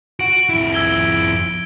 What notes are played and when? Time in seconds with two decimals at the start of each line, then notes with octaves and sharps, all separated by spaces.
0.19 F#4 F#5 D7
0.49 F2 E4
0.74 E6 G#6 G7